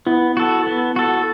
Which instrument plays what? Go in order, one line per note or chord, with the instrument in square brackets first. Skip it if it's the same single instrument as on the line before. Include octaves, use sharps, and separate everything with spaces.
[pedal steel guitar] B3 [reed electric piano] E4
[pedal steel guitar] F#4 A4
B3
F#4 A4